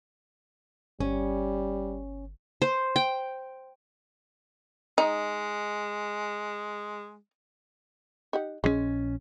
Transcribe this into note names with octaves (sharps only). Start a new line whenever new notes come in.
G1 G3 C#4
C5
G5
G#3 D#4
D#4 G4 F#5
A#1 E3 G#3 C#4